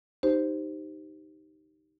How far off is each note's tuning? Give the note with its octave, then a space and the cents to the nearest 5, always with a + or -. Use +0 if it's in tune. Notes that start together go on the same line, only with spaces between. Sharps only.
D#4 +0 G4 -10 C5 +0